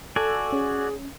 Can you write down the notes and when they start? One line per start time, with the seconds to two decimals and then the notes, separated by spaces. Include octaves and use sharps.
0.16 F#4 A4 D5 G#5 E6
0.52 C#4 G#4